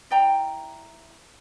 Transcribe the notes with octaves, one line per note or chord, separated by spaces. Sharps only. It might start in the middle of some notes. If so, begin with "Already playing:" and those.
E4 D5 G5 A#5